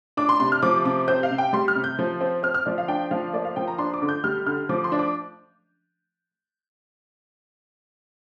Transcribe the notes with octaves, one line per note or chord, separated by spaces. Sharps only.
D4 D6
C6
C3 C6
F6
F3 D6
C3 D6
C4 G6
F5
C3
G5
G3 C6
F6
C3
G6
F3
C4
C4 F6
F6
F3 D5
F5
D4 G5
F3 F5
A#3 D5
F5
F3 G5
A#5
D4 C6
D6
D3
G6
G3 F6
D3 F6
F3 D6
C6
D4
D6